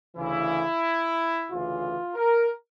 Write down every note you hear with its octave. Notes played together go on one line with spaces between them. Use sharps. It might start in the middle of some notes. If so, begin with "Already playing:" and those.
D2 C#3 E3 E4
D2 C#3 E3 F4
A#4